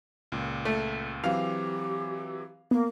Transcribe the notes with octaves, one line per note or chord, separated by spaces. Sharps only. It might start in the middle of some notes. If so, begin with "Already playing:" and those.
C#2 A#2
A3
E3 F#3 C4 G4 F5
A#3 B3